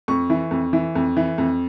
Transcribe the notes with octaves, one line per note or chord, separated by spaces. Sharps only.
F2 C#6
E3
F2
E3
F2
E3
F2